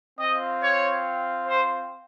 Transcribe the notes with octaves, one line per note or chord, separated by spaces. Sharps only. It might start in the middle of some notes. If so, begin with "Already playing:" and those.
C4 F4 D#5
C#5
C5